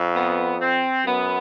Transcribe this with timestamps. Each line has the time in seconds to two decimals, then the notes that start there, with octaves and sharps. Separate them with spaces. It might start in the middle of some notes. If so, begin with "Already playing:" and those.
Already playing: F2
0.14 B3
0.60 C4
1.05 F#2 B3